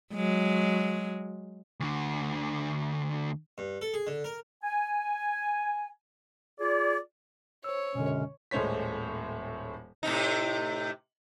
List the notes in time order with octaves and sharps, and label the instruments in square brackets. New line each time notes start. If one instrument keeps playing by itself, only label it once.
[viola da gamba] F#3 G#3
[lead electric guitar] D2 D3
[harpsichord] G2
A4
G#4
D3
A#4
[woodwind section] G#5
F4 G#4 D5
[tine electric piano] C5 E6 [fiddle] C#5
[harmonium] F#2 G#3 C#4 [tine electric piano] B2 D3
[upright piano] D#1 A2 G#3 C5 C#5 B6
[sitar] A2 C3 D#4